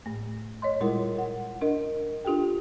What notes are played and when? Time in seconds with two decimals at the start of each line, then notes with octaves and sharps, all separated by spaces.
0.06 A2 A3
0.62 C#5 D#5 C6
0.81 A#2 G3 G#3 E4 F4 A#4
1.18 F#5
1.61 D4 A#4 D#5
2.25 D4 F4 G4 A4 G5